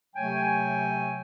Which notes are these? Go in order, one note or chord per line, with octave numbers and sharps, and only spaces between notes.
C3 F#3 A3 C#5 G5 G#5